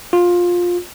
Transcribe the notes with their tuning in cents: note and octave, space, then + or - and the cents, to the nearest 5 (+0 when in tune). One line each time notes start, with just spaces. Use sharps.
F4 +15